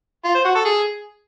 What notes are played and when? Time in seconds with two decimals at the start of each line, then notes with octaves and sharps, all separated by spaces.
0.25 F4
0.35 C5
0.45 F#4
0.55 A4
0.65 G#4